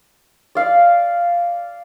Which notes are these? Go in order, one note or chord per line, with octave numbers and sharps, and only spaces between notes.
D5 F5